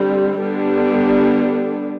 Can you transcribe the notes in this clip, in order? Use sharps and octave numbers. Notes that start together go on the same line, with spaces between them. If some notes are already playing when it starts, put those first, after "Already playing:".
Already playing: D3 G3 C4
D3 G3 B3 D4